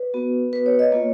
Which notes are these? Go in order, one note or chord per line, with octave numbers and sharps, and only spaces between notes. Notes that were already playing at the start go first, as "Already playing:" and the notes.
Already playing: B4
B3 F#4
B4
C#5
D#5
A#3 F4 C#5